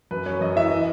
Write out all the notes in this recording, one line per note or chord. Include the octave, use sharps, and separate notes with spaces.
F#2 B4
F#2 C#5
F#2 D#5
E3 E5
E3 D#5